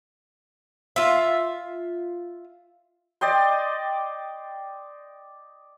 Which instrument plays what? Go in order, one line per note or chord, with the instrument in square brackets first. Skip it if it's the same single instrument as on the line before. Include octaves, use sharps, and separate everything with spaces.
[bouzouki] F4 E5
[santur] D5 D#5 G5 C6